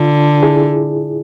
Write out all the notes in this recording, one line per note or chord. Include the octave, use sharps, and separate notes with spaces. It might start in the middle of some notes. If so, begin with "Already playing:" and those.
Already playing: D3 F4
E4 G#4